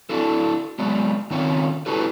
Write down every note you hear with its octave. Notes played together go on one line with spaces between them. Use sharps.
D4 E4 F#4 A4
F#3 G#3 B3 D5
D#3 C4 C#4 D#4 F4 C#5
D4 E4 F#4 G4 A4 B4